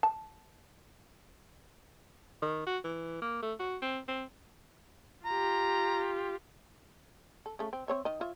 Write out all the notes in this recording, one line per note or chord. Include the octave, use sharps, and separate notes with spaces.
A5
D#3
F#4
E3
A#3
A3
F#4
C4
C4
F4 G4 A#5
A4
C#3 A3
C4
C4 C#5 E5
D#3 D#5
F4 C#5 E5